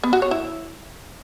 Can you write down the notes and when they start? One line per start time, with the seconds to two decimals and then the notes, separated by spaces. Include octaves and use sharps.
0.03 B3
0.13 F#4
0.22 C#5
0.31 E4